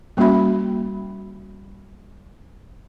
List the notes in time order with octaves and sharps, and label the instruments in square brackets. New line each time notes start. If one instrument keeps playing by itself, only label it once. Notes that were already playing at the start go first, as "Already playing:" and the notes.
[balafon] G3 A#3 C#4 F#4 E5 B5